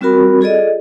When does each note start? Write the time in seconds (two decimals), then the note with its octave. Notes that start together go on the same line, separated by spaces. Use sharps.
0.01 G3 C4 F4 F#4 A#4 B5
0.41 F4 G#4 A4 D5 D#5